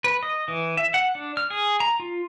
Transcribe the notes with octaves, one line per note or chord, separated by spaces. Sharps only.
B4
D#5
E3
E5
F#5
D4
F6
G#4
A#5
F4